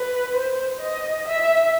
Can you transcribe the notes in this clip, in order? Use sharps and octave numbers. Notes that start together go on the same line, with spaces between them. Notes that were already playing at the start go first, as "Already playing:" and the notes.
Already playing: B4
C5
D#5
E5